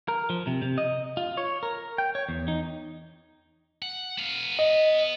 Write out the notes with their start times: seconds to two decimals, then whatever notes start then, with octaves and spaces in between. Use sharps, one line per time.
0.08 A#4
0.30 F3
0.47 C3
0.62 C3
0.78 D#5
1.17 F4
1.37 C#5
1.63 A#4
1.98 G5
2.15 C#5
2.29 E2
2.48 D#4
3.82 F#5
4.18 B3 F5
4.59 D#5